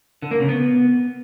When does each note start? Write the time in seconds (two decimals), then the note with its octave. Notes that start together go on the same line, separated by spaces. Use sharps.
0.22 D3
0.31 A#3
0.40 C#3
0.49 B3